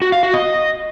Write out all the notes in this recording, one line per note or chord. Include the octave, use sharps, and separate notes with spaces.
F#4
F5
F#4
D#5